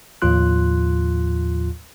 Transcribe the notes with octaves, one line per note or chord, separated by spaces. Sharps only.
D#2 A2 F3 F4 C6 F#6